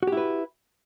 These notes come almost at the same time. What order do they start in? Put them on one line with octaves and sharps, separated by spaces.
F#4 G4 E4 B4